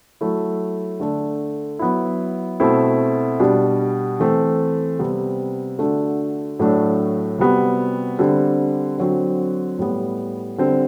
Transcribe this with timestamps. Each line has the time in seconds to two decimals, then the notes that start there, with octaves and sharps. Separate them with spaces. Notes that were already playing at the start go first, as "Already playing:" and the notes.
0.21 F#3 A3 E4
1.00 D3 A3 D4
1.79 F#3 B3 E4
2.60 B2 A3 C4 E4
3.39 B2 G3 D4
4.19 E3 A3 C4
4.99 C3 G3 B3
5.79 D3 A3 D4 F#4
6.59 A2 F#3 A3 D4
7.38 C3 G3 B3 F#4
8.19 D3 G3 C4
8.98 D3 F#3 C4 F#4
9.78 A2 G3 B3
10.58 D3 G3 C4